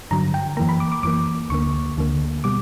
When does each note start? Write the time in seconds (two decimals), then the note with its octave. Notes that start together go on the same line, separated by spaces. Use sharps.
0.11 G2 D3 F#3 A#5
0.34 G5
0.57 F#2 E3 A#3 A#5
0.69 B5
0.80 D6
0.92 D6
1.03 F#2 E3 A#3 D6
1.50 D2 D3 A#3 C#6
1.97 D2 D3 A#3
2.44 B2 G3 D6